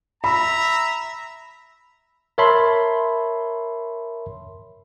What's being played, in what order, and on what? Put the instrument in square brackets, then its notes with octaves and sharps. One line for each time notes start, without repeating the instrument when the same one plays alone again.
[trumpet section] E5 A#5 [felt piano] B5
[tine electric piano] A#4 C#5 E5 A5 B5 C6